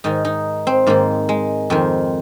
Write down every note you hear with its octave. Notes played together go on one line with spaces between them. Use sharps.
G#2 D#3 D#4
D#4
C4
G#2 D#3 A#3
G#3
F2 D#3 C4